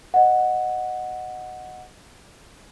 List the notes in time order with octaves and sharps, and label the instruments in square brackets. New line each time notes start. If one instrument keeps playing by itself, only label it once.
[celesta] D#5 F#5